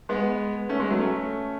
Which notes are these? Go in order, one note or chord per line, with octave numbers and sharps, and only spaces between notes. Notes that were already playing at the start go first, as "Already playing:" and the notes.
G#3 B3
A3 C#4
G#3 B3
F#3 A3
A3 C#4